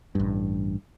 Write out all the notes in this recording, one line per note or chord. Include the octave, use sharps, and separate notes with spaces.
A1 G2